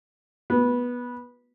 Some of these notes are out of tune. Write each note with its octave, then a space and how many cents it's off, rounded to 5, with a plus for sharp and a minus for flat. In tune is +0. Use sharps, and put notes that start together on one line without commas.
B3 -15